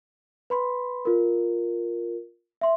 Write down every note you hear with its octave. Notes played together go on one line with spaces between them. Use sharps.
B4 B5 C6
F4 A#4
E5 C6